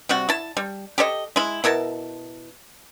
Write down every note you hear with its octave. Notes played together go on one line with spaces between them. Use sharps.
C3 G3 F#4
E4 A5
G3
G4 A4 C#5 D#5
G#3 E4
B2 E4 A#4 A5